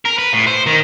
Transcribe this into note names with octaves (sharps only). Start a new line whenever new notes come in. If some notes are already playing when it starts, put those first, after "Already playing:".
A#4
B4
A2
C5
D#3